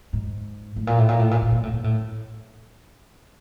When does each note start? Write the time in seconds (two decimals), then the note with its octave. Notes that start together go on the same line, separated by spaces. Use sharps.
0.13 G#2
0.76 A2
0.87 A#2
0.98 A2
1.09 A#2
1.19 A2
1.31 A#2
1.42 A2
1.52 A#2
1.63 A2
1.73 A#2
1.84 A2